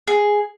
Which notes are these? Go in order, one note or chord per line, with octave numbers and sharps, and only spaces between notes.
G#4